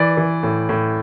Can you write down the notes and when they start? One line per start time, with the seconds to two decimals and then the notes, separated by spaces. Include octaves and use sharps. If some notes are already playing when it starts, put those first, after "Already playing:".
Already playing: E3 D5
0.17 E3
0.43 A2
0.69 A2